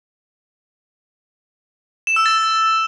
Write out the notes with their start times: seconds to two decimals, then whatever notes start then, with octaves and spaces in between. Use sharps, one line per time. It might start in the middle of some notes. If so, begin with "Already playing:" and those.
2.07 E7
2.16 E6
2.26 A6